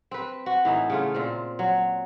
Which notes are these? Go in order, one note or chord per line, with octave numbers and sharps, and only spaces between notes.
C4 B4
F#4
A2 E3 D#4
C#3 A3 F4
A#2 C4
F#3